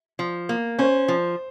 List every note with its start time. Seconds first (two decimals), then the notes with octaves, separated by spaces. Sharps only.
0.19 F3
0.49 A#3
0.79 C#4 C5
1.08 F3